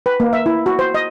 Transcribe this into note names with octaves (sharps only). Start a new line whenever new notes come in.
B4
A#3
E5
E4
F#4
C5
D#5